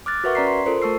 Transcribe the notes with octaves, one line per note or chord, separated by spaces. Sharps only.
D6 F6 F#6 A6
F#4 A#4 B4 E5 F#5 C#6
C#4 D5 A#5 B6 C7
C6
F4 A4 A#4 C5
A3 A5 C#6 E6 C7